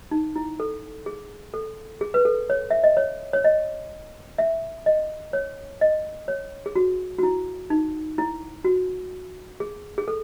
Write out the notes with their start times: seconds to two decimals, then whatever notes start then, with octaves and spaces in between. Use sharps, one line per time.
0.11 D#4
0.36 E4
0.60 A4
1.06 G#4
1.54 A4
2.01 G#4
2.14 B4
2.25 A4
2.50 C#5
2.71 E5
2.84 D#5
2.97 C#5
3.33 C#5
3.44 D#5
4.38 E5
4.86 D#5
5.33 C#5
5.81 D#5
6.28 C#5
6.66 G#4
6.76 F#4
7.18 F#4
7.23 E4
7.70 D#4
8.18 E4
8.64 F#4
9.60 G#4
9.98 G#4
10.08 A4